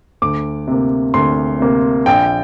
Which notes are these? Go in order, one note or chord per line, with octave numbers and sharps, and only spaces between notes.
D2 D6
C3 A#3
D2 C6
C3 A#3
A#1 G5